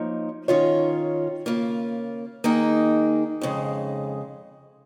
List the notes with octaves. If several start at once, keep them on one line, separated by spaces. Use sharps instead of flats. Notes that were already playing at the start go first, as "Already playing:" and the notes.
Already playing: F3 A#3 D#4 C#5
D#3 C#4 F4 C#5
C#3 A#3 F4
D#3 A#3 D#4 G#4
F2 C#3 G#3